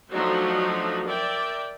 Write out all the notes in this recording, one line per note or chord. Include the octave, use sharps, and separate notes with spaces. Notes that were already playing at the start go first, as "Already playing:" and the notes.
F3 F#3 A3 D4 D#4 F#4
A#4 D5 E5 G5